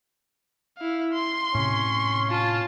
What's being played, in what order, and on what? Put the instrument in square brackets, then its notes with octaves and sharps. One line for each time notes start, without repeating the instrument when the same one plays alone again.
[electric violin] E4 F5
C6
[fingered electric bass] A2 C3 [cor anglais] C#4
[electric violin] F4 A5